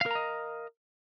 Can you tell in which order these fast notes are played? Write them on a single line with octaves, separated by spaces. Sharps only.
F5 A#4 A#5 D#5